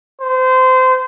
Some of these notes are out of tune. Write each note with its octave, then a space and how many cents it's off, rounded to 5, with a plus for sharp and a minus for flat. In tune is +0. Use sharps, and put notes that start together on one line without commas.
C5 -25